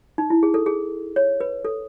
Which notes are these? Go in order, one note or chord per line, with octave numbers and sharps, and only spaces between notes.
D#4
E4
G#4
A4
G#4
C#5
B4
A4